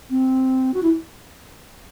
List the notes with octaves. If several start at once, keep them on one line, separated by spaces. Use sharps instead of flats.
C4
F#4
E4